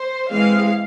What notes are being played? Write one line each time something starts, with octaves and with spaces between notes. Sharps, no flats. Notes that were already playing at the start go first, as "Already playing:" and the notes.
Already playing: C5
E3 G#3 C4 F5